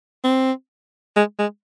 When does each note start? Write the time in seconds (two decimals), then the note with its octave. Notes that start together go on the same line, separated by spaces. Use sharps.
0.24 C4
1.16 G#3
1.39 G#3